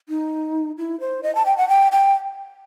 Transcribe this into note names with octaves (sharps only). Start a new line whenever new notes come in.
D#4
E4
C5
D#5
A5
G5
F#5
G5
G5